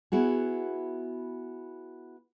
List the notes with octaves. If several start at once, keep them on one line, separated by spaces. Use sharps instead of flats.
B3 E4 F#4 G#4